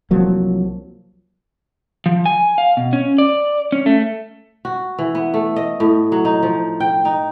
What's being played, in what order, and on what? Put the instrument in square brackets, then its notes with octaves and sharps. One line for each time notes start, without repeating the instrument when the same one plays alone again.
[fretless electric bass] C2 F3 F#3 A#3
[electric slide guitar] F3
G#5
F5
B2
C#4
D5
C#4
A3
[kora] F#4
E3
B3
A3
D#5
A2
F#3
D#4
F3
G5
D#4